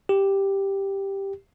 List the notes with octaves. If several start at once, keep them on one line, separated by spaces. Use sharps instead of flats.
G4